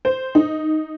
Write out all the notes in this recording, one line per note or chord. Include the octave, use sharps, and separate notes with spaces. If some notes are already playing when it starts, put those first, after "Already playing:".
C5
D#4